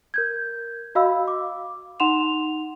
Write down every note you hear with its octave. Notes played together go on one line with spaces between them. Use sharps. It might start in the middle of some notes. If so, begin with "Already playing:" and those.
A#4 G6 G#6
F#4 D#5 F5 B5 E6
D6
D#4 F#5 C6 E7 F7